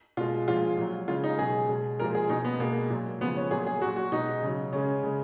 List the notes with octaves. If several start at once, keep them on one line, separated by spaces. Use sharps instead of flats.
B2 G#3 F4
A#2 F3 G#3 F4
A#2 F#3
C#3 G#3 F4
D#4
B2 F#3 G#4
B2 G#3
A#2 F3 G#3 A#4
G#4
B2 G#3 D#4
B3
B2 G#3 A#3
A#2 F#3
C#3 F3 G#3 B3
C#4
A#2 F#3 G#4
G#4
A#2 F#3 F#4
F#4
B2 G#3 D#4
C#3 F#3
C#3 G#3 C#4
C#3 G#3